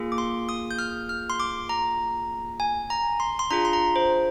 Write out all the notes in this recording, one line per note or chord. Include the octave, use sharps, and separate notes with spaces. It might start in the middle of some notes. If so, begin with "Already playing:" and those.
Already playing: A#3 F4 G#4
D6
C6
D#6
G6
F6
F6
C6
D6
A#5
G#5
A#5
C6
C6
D4 F4 G#4 A#5
C6
A#5
C5